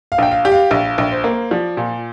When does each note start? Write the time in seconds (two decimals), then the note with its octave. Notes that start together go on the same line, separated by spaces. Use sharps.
0.12 F5
0.18 A#1 G5
0.31 F5
0.45 G4
0.52 F5
0.71 A#1 F5
0.98 A#1
1.11 C5
1.24 A#3
1.51 F3 D5
1.77 A#2